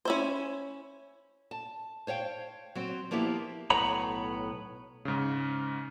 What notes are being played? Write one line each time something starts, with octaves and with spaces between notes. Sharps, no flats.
C#4 E4 C5
A5
C5 C#5 F5 G5
F#3 C4
F3 A#3 B3 E4 G4
B1 A2 B3 C#5 A#5 B5
G#2 C#3